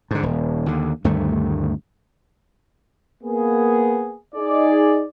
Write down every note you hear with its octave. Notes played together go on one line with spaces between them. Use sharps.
G#2 D3
D#1
D#2 D3
D2 G2 D#3 A3
A#3 B3 G#4
D#4 G#4 D5